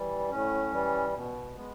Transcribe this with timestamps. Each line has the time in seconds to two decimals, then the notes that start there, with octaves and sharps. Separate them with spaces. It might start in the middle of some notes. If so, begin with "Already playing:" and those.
Already playing: E3 G3
0.30 A2 C#4
0.72 E3 G3
1.14 B2
1.56 G#3 B3